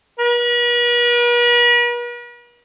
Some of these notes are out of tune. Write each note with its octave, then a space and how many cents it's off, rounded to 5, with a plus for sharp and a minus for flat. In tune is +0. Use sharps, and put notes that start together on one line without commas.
B4 -45